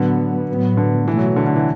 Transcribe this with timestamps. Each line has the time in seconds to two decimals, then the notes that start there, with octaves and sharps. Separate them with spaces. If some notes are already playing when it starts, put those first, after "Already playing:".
Already playing: A2 D3 F#3 B3
0.48 A2 F#3 B3
0.77 D3
1.08 B2 E3 A3
1.17 F#3
1.27 E3
1.36 D3
1.47 D3
1.56 E3